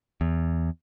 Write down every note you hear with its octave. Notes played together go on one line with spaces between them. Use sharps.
E2